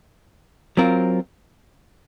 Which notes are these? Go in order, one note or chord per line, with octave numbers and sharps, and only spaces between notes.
F#3 C4 F4 A#4